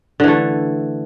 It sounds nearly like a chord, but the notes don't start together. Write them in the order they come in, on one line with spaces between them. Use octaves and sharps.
D3 E3 A3